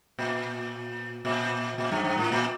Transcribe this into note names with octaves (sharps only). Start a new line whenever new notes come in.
A#2
A#2
A#2
G2
G2
A2
A#2